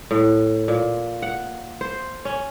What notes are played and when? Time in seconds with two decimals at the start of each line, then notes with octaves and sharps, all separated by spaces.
0.11 A2
0.68 A#2
1.22 F#5
1.81 C5
2.25 C#4